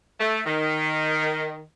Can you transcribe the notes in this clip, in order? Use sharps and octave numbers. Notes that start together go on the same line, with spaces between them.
A3
D#3